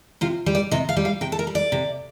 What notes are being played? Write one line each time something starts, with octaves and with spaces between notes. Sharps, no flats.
C3 F4
G3
D5
C3 D#5
F5
G3
F5
C3 G5
A4
A#4
G3
D5
C3